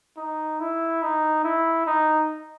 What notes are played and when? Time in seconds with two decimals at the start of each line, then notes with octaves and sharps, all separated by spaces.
0.17 D#4
0.60 E4
1.03 D#4
1.44 E4
1.86 D#4